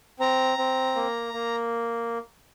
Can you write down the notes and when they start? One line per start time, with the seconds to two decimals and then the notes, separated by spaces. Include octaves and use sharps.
0.20 C4 A#5
0.58 C4
0.95 A#3
1.33 A#3